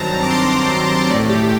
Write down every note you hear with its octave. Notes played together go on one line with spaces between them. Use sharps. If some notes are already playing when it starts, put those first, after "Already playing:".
Already playing: G2 D#3 F#3 C4 A5 A#5
D6
C6
A1 A2 A3 D5
G4